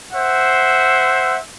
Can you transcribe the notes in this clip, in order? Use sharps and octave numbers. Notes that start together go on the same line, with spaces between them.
C5 E5 F#5